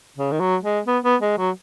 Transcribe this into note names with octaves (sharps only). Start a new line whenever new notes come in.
C#3
D#3
F#3
G#3
B3
B3
G#3
F#3